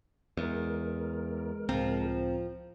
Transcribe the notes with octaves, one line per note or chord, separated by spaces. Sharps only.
E2 G#3 A#4
C#2 A2 F3 C4 A#5